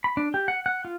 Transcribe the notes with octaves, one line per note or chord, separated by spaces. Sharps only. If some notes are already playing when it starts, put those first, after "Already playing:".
B5
D4
G4
F#5
F#5
F4